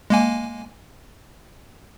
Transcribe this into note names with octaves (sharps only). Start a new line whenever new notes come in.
G#3 A#3 G#5